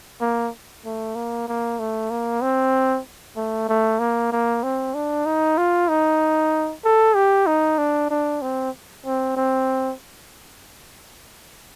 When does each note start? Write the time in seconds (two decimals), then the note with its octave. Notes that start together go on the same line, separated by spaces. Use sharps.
0.21 A#3
0.85 A3
1.16 A#3
1.48 A#3
1.79 A3
2.10 A#3
2.42 C4
3.36 A3
3.69 A3
3.99 A#3
4.32 A#3
4.63 C4
4.94 D4
5.26 D#4
5.57 F4
5.89 D#4
6.85 A4
7.15 G4
7.46 D#4
7.78 D4
8.10 D4
8.42 C4
9.05 C4
9.36 C4